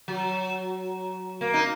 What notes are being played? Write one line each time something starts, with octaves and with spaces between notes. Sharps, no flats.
F#3
A#3
D#4